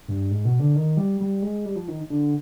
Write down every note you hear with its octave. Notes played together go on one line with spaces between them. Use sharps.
G2
G#2
B2
D3
D#3
G3
G3
G#3
G3
F3
D#3
D3